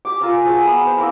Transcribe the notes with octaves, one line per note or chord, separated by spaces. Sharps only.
G4 D6
F4 A#4 G#5 E6
F#4 G#4 C5 A5
B3 B4
B4 C5
A#3 C4 E4 A#4